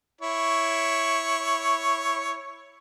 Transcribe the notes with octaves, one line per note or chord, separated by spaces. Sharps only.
E4 C#5